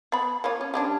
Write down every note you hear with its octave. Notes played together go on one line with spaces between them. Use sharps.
B3 B5
A#3 F4 C#5
C#4
G3 C#4 D4